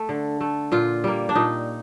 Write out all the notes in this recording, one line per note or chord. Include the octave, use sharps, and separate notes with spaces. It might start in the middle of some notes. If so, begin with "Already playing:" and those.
Already playing: A3
D3
A3
A#2 F4
G3 A#3
D4
A#2 D#4